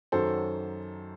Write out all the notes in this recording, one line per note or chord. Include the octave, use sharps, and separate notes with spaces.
F#2 D#3 F#3 A4 C5